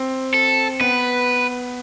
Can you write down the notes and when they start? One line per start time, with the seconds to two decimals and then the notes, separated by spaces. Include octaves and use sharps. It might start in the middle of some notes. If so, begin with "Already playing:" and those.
Already playing: C4
0.34 A4
0.80 B3 B4